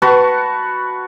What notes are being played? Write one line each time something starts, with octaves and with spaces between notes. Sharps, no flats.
F#4 B4 A5 C#6